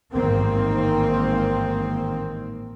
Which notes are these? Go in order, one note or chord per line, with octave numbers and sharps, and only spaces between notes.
A1 G#2 D#3 A#3 C4